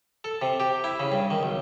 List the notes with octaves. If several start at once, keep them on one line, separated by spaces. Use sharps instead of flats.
A4
C3
G4
E4
C#3
G2
D#3
B1